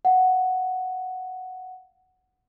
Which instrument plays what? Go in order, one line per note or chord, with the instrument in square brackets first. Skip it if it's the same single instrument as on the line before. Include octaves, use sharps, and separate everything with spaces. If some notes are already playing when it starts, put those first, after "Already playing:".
[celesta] F5 F#5